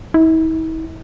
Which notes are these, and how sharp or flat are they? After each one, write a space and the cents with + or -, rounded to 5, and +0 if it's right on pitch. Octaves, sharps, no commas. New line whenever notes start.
E4 -45